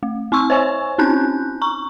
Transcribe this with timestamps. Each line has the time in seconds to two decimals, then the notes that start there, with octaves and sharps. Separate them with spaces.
0.03 A3
0.32 C4 C6 C#6 E6
0.50 C5 C#5 G#5 C#6
0.98 C4 C#4 D#4 F#6 G6
1.62 A#5 C#6